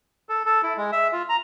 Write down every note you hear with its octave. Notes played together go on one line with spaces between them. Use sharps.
A4
A4
E4
G#3
E5
F4
A#5